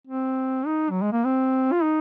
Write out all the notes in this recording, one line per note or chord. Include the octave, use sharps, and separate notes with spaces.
C4
D#4
F#3
G#3
A#3
C4
F4
D#4